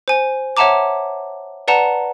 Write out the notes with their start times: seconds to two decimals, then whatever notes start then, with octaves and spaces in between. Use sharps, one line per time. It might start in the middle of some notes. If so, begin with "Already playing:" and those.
0.08 C5 G#5
0.57 C#5 E5 F#5 A5 A#5 D6
1.68 B4 D5 F#5 A5 A#5